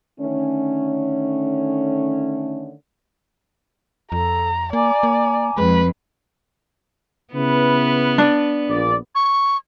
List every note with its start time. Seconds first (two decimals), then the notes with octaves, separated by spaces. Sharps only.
0.20 D3 D#3 A3 C#4
4.12 F2 A4 A#5
4.73 A#3 D5 G#5 A#5 D6
5.03 A#3
5.58 F2 G#3 B4
7.34 C#3 B3 E4 B4
8.18 D4
8.69 A#1 A#2 D5
9.15 C#6